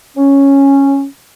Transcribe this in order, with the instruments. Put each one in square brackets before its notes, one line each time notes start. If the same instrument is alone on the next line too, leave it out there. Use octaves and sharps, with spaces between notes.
[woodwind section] C#4